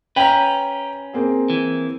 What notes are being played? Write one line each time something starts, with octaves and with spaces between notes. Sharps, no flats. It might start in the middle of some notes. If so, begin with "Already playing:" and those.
C#4 B4 G5 A#5
A#3 C4 G#4
E3